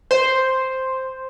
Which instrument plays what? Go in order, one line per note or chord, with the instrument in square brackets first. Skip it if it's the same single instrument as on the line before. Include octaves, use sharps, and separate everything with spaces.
[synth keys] C5